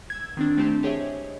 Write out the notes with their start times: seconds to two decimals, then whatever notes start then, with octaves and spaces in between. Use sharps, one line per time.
0.10 E6 G#6
0.37 D#3 C4 D4
0.57 A3 C4 E4 G4 C5 A5
0.83 G4 G#4 C#5 D#5 E5